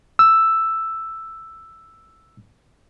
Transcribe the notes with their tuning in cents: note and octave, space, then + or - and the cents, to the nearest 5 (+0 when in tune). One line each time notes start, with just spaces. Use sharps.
E6 +5